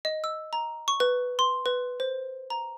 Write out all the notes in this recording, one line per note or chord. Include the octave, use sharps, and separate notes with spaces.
D#5
E6
A#5
C#6
B4
C6
B4
C5
A#5